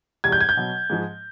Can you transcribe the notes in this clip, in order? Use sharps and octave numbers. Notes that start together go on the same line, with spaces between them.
E2 B2 G3 G#6
G6
G#6
G6
B2 F#3
G#2 F3 G#3